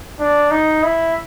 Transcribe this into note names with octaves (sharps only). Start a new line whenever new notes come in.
D4
D#4
E4